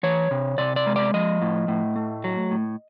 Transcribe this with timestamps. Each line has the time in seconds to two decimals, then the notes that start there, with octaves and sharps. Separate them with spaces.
0.03 E3 C#5
0.31 C3
0.58 C3 D5
0.76 D5
0.87 G#3
0.96 D5
1.14 F3 D#5
1.42 A2
1.68 A2
1.96 A3
2.24 F#3
2.51 A2